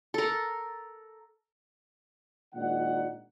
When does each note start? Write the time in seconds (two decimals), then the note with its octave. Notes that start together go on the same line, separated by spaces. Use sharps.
0.14 A4 A#4
2.55 G#1 A#2 D#3 D4 F#5